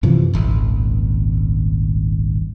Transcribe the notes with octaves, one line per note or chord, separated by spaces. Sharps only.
F#2 C3 E3 F3
D#1 G#1 C#2